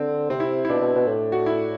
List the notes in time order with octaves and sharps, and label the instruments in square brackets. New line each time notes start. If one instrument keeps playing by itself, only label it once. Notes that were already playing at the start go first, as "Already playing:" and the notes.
Already playing: [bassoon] D3 [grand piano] C4
[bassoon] C3 [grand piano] C4
[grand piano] E4
E4
[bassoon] B2 [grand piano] D4
[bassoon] B2
B2
A2
[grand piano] F#4
E4